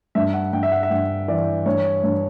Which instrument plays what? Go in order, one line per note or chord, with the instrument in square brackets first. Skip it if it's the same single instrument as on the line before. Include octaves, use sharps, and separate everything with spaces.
[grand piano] G2 E5
F#5
G2 G5
E5
F#5
E5
G2 F#5
E3 D5
G2 C#5
G2